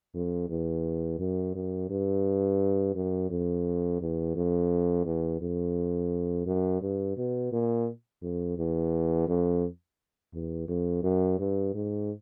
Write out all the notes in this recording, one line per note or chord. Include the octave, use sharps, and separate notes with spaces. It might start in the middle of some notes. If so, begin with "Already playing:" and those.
F2
E2
F#2
F#2
G2
F#2
F2
E2
F2
E2
F2
F#2
G2
B2
A#2
F2
E2
F2
E2
F2
F#2
G2
G#2